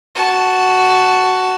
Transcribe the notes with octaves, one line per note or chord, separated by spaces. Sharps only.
F#4 A5